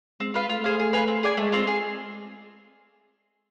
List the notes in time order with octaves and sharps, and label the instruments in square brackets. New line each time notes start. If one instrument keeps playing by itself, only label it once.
[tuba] G#3 [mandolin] C4
[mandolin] F4 B4 F5
[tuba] A3 [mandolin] F4
[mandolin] G#4 C5 F5
G#4
B4 F5 G#5
C4
G#4 D5 G#5
[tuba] G#3 [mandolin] A3
[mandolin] C4 F4
G#4